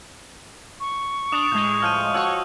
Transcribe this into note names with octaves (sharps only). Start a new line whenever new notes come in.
C#6
D4 D#6 E7 F7
A2 G#3 G6 F7
F3 F6 G6 D#7
F3 F#4 C#5 D#5 E6